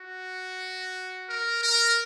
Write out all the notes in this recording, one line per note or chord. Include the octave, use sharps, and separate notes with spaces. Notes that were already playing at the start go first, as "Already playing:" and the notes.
Already playing: F#4
A#4
A#4